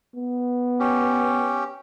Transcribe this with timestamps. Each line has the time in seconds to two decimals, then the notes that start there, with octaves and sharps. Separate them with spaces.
0.15 B3
0.80 C#4 G4